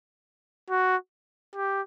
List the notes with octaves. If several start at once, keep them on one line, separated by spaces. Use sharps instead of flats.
F#4
G4